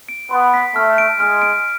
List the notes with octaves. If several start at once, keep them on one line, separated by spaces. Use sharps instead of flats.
D7
B3 C6
B6
A3 F6
D7
G#3 F6
D7